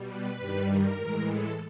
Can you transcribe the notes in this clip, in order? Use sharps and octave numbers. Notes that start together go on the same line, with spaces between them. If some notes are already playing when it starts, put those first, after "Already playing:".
Already playing: B2 G3
B4
G2 D#3 G3
A#4
A2 E3 G#3
A4